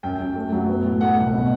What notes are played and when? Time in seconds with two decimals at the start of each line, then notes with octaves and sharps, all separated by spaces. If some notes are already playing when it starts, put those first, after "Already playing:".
0.03 F#2 G5
0.20 F#2
0.36 A3
0.52 F#3
0.68 B3
0.85 A2
1.01 A3 F#5
1.17 C2
1.33 B2